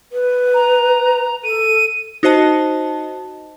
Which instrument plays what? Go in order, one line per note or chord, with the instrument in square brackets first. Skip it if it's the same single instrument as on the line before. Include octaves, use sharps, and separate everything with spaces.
[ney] B4
[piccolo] A#5
[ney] A4 [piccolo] D#7
[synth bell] D#4 F#4 C5 D#5 A5